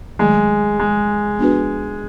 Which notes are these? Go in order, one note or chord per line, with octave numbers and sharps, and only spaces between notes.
D#3 F#3 G#3 A3
G#3
B3 D4 F#4 B4